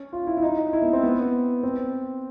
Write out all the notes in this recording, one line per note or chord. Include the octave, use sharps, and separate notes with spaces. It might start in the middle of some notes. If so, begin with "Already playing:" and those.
Already playing: C#4
F4
E4
E4
D#4
E4
B3
C4
B3
C4